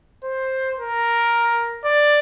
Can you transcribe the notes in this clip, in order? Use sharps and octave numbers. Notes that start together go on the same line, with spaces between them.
C5
A#4
D5